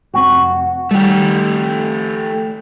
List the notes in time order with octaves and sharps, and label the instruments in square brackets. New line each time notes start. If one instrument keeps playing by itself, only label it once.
[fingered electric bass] F1 G#2 C4 [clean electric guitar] F#4
[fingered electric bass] D#3 G3 [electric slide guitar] A3 G4